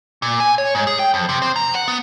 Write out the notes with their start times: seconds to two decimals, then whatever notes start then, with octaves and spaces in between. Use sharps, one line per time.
0.22 A#2
0.40 G#5
0.58 C#5
0.75 G#2
0.87 G#4
0.99 G5
1.14 F2
1.29 C3
1.42 C4
1.56 A#5
1.74 F#5
1.88 B3